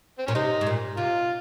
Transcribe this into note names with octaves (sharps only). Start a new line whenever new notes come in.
C4
A#2 C#4
C3 D#4
G#2
A#2
C3 F4